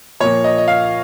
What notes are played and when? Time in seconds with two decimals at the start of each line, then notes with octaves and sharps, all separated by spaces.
0.20 A#2 F3 A#3 C#5
0.44 D#5
0.58 D#5
0.68 F5